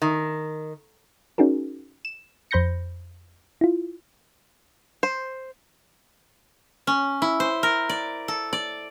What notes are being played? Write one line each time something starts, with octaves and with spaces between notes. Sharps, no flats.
D#3
C#4 D#4 F#4 G#4 A#4
E7
F2 C5 B5 G6 A#6 C#7
E4 F4
C5
C#4
E4
C5
A#4
D5
A4
D5